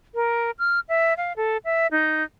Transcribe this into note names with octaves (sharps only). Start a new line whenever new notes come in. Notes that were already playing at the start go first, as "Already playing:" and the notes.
A#4
F6
E5
F5
A4
E5
D#4